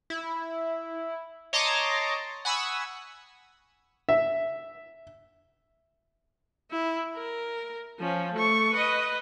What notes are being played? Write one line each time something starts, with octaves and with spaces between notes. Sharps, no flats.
E4
C#5 D#5 A5 A#5 C6 D6
F#5 G#5 B5 C#6 D#6 E6
E5
E4
A#4
F3 C#4
A3 C#6
B4 D#5